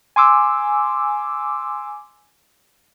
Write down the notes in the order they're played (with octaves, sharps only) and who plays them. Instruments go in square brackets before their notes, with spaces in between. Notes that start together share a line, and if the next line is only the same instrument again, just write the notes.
[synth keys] G#5 C6 D6 E6